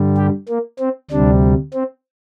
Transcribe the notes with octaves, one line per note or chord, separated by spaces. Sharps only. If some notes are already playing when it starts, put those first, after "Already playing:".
Already playing: G2 D3 G3
G4
A#3
C4
D2 C3 G3 D4
C4